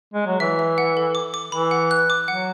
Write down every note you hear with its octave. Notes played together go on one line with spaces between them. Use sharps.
G#3
F#3
E3 E5
E5
F#5
A4
D6
D6
E3 B5
F#5
F#6
D6
F#3 F#5